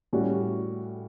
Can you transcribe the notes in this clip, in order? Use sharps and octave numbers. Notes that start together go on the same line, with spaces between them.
A2 G3 C#4 F#4